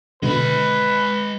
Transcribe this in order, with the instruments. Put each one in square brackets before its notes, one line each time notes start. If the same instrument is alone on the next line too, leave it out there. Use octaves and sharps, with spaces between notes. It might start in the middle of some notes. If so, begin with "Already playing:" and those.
[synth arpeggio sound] B2 D3 [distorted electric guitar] G#3 B5 [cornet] B4